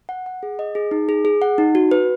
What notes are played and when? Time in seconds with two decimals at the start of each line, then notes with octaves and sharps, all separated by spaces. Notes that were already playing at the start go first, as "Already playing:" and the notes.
0.09 F#5
0.26 F#5
0.43 G#4
0.59 D#5
0.75 G#4
0.91 D#4
1.09 G#4
1.25 G#4
1.42 F#5
1.58 D#4
1.75 F#4
1.91 B4